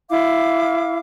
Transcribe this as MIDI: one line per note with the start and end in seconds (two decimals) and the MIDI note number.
0.09 0.98 64
0.09 0.98 77
0.09 0.98 86